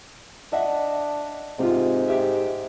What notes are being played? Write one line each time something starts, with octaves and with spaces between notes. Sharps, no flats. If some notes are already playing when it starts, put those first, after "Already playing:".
D4 D#5 E5 F#5
G#2 C3 F4
G4 E5